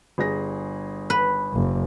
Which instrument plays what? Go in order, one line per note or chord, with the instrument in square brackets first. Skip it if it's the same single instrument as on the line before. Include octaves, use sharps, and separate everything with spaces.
[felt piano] G1 G#4 A#6
[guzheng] B4
[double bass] F#1